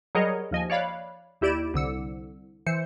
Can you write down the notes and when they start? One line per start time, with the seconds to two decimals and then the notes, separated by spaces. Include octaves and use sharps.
0.15 F#3 G3 G#4 A#4 C#5 D#5
0.51 D#2 F3 D#5 G#5
0.70 C#5 D5 F5 B5 F#6
1.41 D#2 E4 G4 D5 D7 E7
1.74 C2 D3 E6 C#7
2.67 E3 C5 C#7